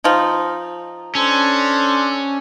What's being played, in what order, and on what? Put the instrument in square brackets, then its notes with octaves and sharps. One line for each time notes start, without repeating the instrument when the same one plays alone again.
[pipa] F3 D#4
[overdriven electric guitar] C#4 [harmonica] D4 A4 C5